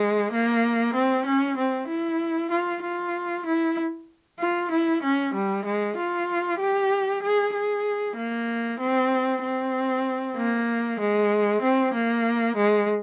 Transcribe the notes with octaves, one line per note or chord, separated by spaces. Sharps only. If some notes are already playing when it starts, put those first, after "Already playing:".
Already playing: G#3
A#3
C4
C#4
C4
E4
F4
F4
E4
F4
E4
C#4
G3
G#3
F4
G4
G#4
G#4
A#3
C4
C4
A#3
G#3
C4
A#3
G#3